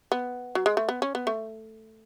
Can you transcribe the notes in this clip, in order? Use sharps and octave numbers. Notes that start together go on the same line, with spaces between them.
B3
F#3
G#3
A3
B3
C#4
B3
A3